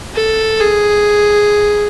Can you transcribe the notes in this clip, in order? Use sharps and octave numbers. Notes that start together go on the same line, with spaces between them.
A4
G#4